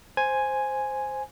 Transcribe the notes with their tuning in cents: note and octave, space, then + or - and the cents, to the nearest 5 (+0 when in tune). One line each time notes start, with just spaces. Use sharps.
C5 +0 G#5 +0